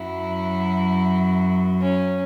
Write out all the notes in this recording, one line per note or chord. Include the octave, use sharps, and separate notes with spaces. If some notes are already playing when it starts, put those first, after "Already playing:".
Already playing: F#2 F#3 E4
C#4